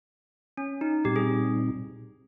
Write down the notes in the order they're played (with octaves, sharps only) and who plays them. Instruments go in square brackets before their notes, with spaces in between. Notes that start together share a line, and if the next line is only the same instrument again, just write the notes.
[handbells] C#4
D#4
[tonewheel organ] A#2 G3 C4 D#4 [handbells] G4
[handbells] G#4